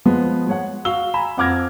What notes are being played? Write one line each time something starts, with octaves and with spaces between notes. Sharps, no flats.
F3 G#3 B3
G#3 C#5 F#5
F#4 F5 E6 G7
G#5 A#5 B5 E7
F2 F#5 D6 F6 G#6 A#6